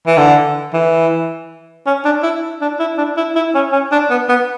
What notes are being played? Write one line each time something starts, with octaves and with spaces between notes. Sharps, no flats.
E3
D3
E3
C#4
D4
E4
D4
E4
D4
E4
E4
C#4
C#4
D4
B3
B3